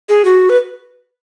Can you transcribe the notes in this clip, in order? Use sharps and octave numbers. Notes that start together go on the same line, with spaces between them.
G#4
F#4
B4